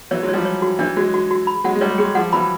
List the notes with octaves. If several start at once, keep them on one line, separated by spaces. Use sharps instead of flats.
E3 F#3 C#5
F#3 G#3
C#5
F3 G3
C#5
F#4
E3 F#3 D4
F#3 G#3 F#4
F#4
F#4
B5
F#3 G#3 F#5
G#3
G3 A3 C#5
F#3 G#3 G#4
F3 G3 F#5
E3 F#3 B5